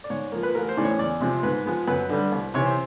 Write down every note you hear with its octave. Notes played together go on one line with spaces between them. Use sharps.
D5
G#2 C#5
F3 A#3
B4
A1 A#4
C5
A2 E3 G#3 C#4 D5
C#5
E2 D5
C3 F3 G#3 C4
G#2 B4
F3 G#3 B3
F#2 B4
D3 G3
C2
C3 E3 C#5
C5